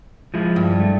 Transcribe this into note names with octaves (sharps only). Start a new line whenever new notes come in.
F3 G#3 E4
G2
A3